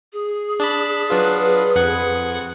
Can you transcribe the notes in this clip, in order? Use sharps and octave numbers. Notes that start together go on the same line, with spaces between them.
G#4
D4 A5 B5
F#3 D4 F4 B4
F2 F#5 G#6